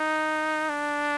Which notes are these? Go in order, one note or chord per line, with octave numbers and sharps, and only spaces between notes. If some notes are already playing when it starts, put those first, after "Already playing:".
Already playing: D#4
D4